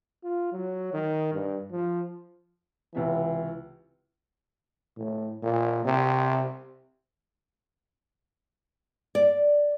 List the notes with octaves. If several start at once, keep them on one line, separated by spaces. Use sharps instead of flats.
F4
F#3
D#3
G2
F3
C#2 C3 E3 E5
A2
A#2
C3
D5